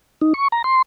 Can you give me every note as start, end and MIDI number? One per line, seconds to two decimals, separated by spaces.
0.21 0.33 63
0.34 0.48 85
0.52 0.62 82
0.64 0.82 84